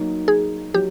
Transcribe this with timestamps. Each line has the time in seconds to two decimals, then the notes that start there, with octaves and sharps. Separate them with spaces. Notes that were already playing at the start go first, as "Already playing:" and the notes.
Already playing: F#3 A#3 D#4 F#4
0.28 G#4
0.74 F#3 G4